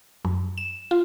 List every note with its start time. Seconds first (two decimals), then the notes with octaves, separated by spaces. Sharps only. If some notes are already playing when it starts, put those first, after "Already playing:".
0.25 F#2
0.58 E7
0.91 F4